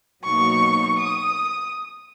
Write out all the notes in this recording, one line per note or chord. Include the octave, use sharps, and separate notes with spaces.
B2 F#3 A#3 D#4 C#6
D#6